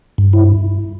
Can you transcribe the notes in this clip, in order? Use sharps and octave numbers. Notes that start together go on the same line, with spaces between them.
G2
E4